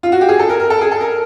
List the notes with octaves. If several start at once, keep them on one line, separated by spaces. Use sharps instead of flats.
F4
F#4
G4
G#4
A4
A#4
A#4
A4
G#4
A4
A#4